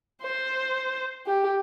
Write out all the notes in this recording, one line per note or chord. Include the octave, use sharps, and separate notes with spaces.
C5
G4